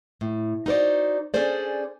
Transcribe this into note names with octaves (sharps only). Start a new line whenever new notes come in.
A2
D#4 F#4 A#4 C5 D5
C#4 D4 G#4 A4 C5 D5